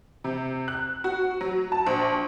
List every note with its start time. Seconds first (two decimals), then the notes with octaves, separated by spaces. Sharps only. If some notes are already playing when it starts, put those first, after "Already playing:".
0.24 C3
0.68 F#6
1.04 F#4
1.41 F#3
1.72 A5
1.87 A#1